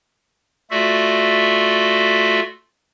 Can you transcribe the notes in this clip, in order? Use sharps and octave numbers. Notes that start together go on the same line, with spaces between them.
A3 F4 F#4 A4 D5 E5